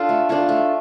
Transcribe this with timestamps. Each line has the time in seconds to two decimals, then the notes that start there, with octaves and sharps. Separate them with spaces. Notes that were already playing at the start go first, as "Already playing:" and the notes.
Already playing: D4 F4 A4
0.09 A3
0.29 D4 F4 A4
0.49 A3